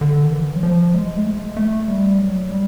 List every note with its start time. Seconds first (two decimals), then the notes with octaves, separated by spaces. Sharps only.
0.01 D3
0.21 D#3
0.32 E3
0.55 F#3
0.63 F3
0.94 G#3
1.16 A3
1.26 G#3
1.57 A3
1.88 G3
2.19 F#3
2.50 G3